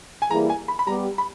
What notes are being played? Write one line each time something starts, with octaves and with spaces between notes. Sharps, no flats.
G#5
E3 G3 A#3 E4 G#4 A#5
G#5
B5
B5
G3 B3 G4 A#5
B5